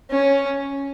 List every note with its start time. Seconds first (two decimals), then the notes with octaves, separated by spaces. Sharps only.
0.11 C#4